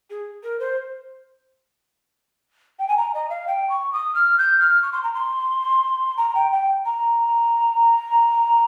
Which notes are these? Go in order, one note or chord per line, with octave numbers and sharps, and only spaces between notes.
G#4
A#4
C5
G5
G#5
A#5
D#5
F5
G5
C#6
D#6
F6
G6
F6
C#6
C6
A#5
C6
A#5
G5
G5
A#5